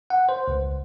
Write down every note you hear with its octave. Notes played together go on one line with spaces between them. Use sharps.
F#5
C5
C#2